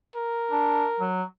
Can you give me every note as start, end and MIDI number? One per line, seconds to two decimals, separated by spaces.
0.16 1.08 70
0.51 0.85 62
1.00 1.23 54